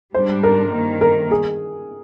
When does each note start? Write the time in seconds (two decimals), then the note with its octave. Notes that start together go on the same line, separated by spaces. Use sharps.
0.14 G#2 G3 D4 C5
0.43 A#4
0.73 G2 D#3 A#3
1.01 A#4
1.31 G#4